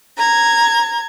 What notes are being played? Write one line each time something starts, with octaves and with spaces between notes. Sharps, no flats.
A#5 G#6